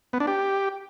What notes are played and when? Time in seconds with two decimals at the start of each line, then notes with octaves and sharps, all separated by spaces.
0.13 B3
0.20 D4
0.27 G4